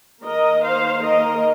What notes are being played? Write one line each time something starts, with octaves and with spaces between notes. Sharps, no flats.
D#3 A#3 A#4 D#5
C5 F5
A#4 D#5